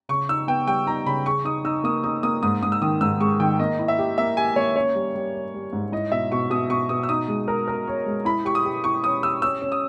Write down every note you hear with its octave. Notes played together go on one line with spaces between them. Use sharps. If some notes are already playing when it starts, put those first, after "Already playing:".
C#3 C#6
D#4 E6
B3 G5
G3 G5
D#4 A#5
C#3 B5
G#4 C#6
D#4 D#6
D#4 E6
A#3 D#6
D#4 D#6
A#3 D#6
G#2 D#6
G#2 D#6
E6
D#3 D#6
G#2 E6
G#3 C#6
D#3 G5
A#3 D#5
E4
E5
G4
A#3 E5
G4 G#5
A#3 C#5
C#4 C#5
G3
G3
C#4
G3
G#2
E4 D#5
B2 E5
B2 C#6
B2 D#6
B2 C#6
B2 D#6
E6
D#4 D#6
G#3
A#4
A#4
C#5
G#3
E4 B5
G4 C#6
D#6
G4
E4 C#6
C#4 D#6
G4 E6
C#4 E6
C#4
D#6